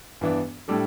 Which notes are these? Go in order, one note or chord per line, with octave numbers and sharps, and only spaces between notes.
G2 E3 B3 D4
A2 G3 D4 A4